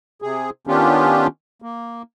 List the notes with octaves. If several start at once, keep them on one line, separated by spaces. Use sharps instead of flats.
C3 G#4
D#3 B3 C#4 D4 F4 G4
A#3